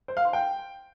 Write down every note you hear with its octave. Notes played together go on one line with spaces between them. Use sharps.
C5
F5
C6
G5